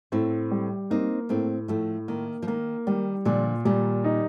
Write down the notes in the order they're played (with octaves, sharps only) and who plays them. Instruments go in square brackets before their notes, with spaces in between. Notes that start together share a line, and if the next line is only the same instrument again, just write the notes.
[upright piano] A2 [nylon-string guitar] A3 C4
[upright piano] G3
[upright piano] A#3 [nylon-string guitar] C4 D#4
[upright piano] A2 [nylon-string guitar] A3 C4
[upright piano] A2 [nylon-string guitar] F3 A3
[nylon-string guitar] D#3 [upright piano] A#3
[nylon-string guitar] F3
[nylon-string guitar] D#3 [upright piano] A#3
[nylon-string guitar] D#3 [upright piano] G3
[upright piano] A#2 [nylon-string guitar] D3 F3
[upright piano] A#2 [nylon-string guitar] D#3 G3
[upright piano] D#4